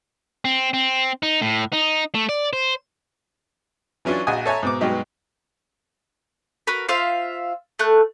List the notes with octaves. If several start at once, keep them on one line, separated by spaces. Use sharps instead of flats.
C4
C4
D#4
A2
D#4
A3
D5
C5
E3 F#3 C#4 D4 F4
A#1 F#4 D#5 G#5 D#6
A4 C#5 E5 G#5 A#5
G#2 B2 D6
G2 B2 F#3 G#3 D#4 G4
F#4 A#4 B4
F4 C5 E5 F5
A3 F#6